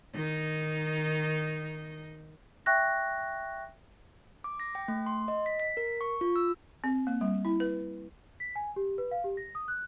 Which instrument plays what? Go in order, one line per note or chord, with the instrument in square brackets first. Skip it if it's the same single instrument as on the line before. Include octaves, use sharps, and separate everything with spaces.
[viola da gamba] D#3 D#4
[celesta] E5 G5 C#6 F#6 A#6
[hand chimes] D6
A#6
G5
A3
C6
D#5
B6
B6
A#4
C#6
F4
E6
[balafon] C4
A#3
G3
E4
B4
[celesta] B6
G#5
G4
B4
F5
G4
A#6
D#6
F#6